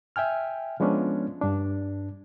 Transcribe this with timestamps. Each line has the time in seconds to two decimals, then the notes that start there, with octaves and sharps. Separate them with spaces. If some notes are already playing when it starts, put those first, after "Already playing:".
0.16 E5 G5 G#5 F6
0.80 F3 G#3 B3 C#4 D4
1.41 G2 D4